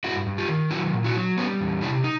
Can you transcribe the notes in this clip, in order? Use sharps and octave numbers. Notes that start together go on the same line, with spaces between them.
G2 E4 F#4
G2
F4 G4
D#3
F#3 E4 F#4
A#2
E4 F#4
F#3
G3 B3 C#4
E2
C3 D4 E4
D#4